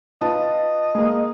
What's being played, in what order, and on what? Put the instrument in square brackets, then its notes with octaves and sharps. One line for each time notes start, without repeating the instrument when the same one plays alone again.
[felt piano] F4 B4 A5 [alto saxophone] D#5
[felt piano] G#3 A#3